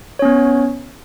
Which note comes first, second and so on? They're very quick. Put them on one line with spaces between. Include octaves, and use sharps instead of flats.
C#5 C#4 B3